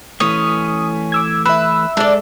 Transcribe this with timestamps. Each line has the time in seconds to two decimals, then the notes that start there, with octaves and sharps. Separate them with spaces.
0.20 E3 A3 C#4 D#6
1.12 D6 E6 G#6
1.46 B4 E5 E6
1.97 G#3 D4 G#4 A4 D5